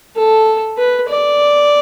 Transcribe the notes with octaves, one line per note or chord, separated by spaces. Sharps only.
A4
B4
D5